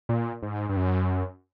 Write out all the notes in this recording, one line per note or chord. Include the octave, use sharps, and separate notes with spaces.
A#2
G#2
G2
F#2